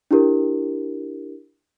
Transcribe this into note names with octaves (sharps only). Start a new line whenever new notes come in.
D4 E4 G4 A#4